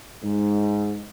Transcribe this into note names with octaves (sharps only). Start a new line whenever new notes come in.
G#2